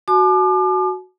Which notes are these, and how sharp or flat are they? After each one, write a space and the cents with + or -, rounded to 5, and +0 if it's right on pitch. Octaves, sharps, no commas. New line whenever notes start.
F#4 +0 A5 -45 D6 +35